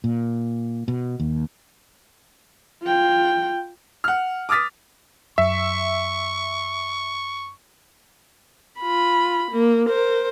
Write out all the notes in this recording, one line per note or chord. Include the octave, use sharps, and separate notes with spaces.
A#2
B2
D#2
F4 G5
F#5 F6
D6 D#6 F6 A6 B6
F#2 E5 C#6
F4 B5
A#3
A#4 C5